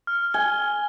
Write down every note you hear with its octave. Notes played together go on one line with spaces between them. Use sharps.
F6
G#5 G7